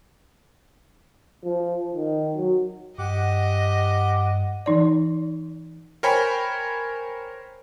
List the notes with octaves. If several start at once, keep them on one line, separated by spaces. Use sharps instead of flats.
F3
D#3
F#3
G2 G4 D#5 F#5 D6
E3 D#4 D5
A#4 C5 C#5 G5 G#5 B5